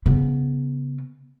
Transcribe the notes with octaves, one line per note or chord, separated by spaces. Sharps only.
C#3 B3